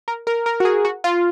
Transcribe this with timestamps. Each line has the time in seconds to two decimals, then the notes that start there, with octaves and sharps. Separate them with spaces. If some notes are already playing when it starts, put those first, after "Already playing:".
0.08 A#4
0.27 A#4
0.46 A#4
0.60 F#4
0.65 G#4
0.85 F#4
1.04 F4